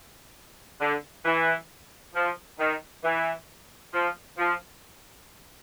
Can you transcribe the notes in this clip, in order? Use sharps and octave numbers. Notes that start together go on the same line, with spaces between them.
D3
E3
F3
D#3
E3
F3
F3